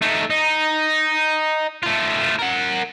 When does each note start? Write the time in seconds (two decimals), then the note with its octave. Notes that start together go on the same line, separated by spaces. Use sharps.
0.02 A3 D#4
0.30 D#4
1.83 A3 F4
2.39 A#4 F#5